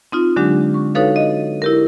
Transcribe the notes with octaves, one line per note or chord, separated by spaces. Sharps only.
C4 D#4 F4
D3 F#3 G#3 D4 G4
C#6
D#4 F#4 A4 B4 C#5 F5
D#5
E4 G4 A#4